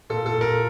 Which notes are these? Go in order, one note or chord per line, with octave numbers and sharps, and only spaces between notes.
A#2 A4
A4
A#2
A#4